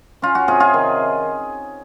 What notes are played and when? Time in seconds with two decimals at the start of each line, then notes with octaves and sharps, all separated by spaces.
0.22 C#4 F4
0.35 F#4
0.48 C3 F4 G#4
0.60 F4 G#4
0.74 D#3